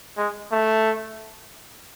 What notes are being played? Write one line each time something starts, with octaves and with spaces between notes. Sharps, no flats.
G#3
A3